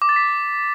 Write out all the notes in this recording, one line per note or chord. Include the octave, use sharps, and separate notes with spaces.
D6
A6
B6